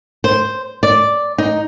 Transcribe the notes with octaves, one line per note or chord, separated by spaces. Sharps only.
C5
D5
D#4